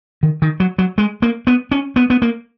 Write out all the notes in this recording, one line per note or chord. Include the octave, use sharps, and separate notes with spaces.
D#3
D#3
F#3
F#3
G#3
A#3
B3
C#4
B3
B3
A#3